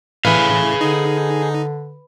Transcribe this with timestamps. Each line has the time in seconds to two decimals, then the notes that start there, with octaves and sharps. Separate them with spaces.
0.25 A2 E3 G#4 B4 F5
0.81 D3 D#4